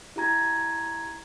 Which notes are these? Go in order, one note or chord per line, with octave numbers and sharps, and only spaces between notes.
E4 G4 A#5 G#6